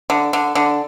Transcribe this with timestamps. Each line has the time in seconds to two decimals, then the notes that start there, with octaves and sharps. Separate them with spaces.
0.10 D3
0.33 D3
0.55 D3